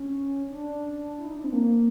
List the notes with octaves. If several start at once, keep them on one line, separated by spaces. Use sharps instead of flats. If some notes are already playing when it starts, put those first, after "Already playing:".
Already playing: C#4
D4
E4
D#4
D4
C4
A#3